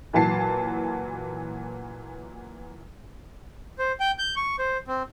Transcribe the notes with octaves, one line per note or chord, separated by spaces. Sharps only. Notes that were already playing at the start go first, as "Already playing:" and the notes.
A#2 E3 F#3 A5 C7
C5
G5
G6
C#6
C5
C4